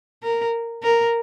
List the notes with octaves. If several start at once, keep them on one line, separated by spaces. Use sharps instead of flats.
A#4
A#4